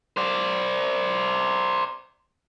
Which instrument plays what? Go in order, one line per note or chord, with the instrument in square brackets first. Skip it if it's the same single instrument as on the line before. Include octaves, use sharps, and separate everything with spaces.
[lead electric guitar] C5 D5